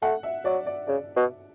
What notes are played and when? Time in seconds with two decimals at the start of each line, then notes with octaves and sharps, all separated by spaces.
0.02 A3 F#5
0.23 E5
0.44 F#3 D5
0.66 D5
0.87 C#3 D5
1.16 B2